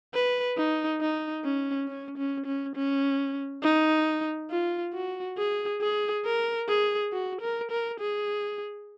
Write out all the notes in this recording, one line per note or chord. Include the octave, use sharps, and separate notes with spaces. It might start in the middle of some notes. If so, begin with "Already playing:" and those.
B4
D#4
D#4
C#4
C#4
C#4
C#4
C#4
D#4
F4
F#4
G#4
G#4
A#4
G#4
F#4
A#4
A#4
G#4